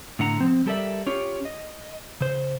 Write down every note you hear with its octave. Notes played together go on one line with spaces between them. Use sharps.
A2 D3 F#5 A#5
F3 C4
G3 G4 A4 A#4 D5 E5
C#4 F4 G4 C#5
D#5
C#3 C5